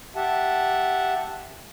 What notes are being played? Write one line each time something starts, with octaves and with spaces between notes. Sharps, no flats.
G4 E5 F#5 A5